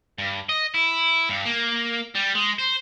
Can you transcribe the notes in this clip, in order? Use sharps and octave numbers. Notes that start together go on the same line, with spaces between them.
G2
D#5
E4
G2
A#3
G3
G#3
C5